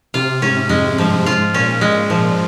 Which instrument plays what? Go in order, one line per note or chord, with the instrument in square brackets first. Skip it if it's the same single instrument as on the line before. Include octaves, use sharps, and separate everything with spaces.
[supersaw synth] C3 [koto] F4
[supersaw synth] G#2 [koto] C#4
[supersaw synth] F2 [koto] G#3
[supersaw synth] G2 [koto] F3
[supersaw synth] G#2 [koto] F4
[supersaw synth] A#2 [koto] C#4
[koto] G#3
F3